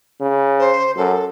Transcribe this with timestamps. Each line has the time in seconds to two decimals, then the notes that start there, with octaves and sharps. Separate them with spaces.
0.21 C#3
0.59 C5
0.97 F#2 A4